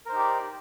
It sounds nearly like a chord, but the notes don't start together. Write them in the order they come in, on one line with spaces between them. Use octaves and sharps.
A#4 C5 D#4 G4 D5